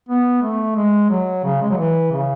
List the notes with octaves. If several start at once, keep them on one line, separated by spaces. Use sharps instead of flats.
B3
A3
G#3
F#3
C#3
G#3
F#3
E3
C#3